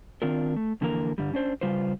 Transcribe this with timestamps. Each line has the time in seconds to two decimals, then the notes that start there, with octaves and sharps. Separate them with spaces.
0.22 D#3 C4 D4 F4 A#4
0.56 A3
0.81 F2 D3 E3 A#3 A#4
1.18 G2 D3 G3
1.33 C#4 D4 C5
1.61 C#3 G3 F4 B4 C5